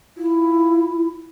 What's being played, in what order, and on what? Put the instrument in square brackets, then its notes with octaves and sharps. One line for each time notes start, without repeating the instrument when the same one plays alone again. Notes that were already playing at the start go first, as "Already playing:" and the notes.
[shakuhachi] E4 [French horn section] F4